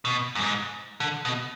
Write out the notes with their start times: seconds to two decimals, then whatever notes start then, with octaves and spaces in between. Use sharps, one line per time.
0.05 B2
0.35 F#2
0.41 G#2
1.00 D3
1.25 B2